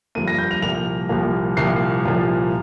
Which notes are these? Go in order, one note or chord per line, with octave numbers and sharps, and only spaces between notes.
G2 F3 A#3 D#7
A#6
G6
F7
C2 A#2 F3 A#3 F7
C2 A#2 F3 A#3
C2 A#2 F3 A#3 C7
C2 A#2 F3 A#3